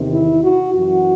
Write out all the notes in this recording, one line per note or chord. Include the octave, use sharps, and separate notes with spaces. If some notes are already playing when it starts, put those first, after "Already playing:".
Already playing: E2 C3 D#3
E4
F#4
F#2 E3 F#4